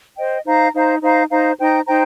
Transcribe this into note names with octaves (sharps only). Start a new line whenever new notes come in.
C5 D#5 G5
D#4 C5 F5 A#5
D#4 C5 F5 A#5
D#4 C5 F5 A#5
D#4 C5 F5 A#5
D#4 C5 G5 A#5
D#4 C5 G5 A#5